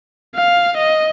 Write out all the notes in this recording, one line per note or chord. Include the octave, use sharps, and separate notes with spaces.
F5
D#5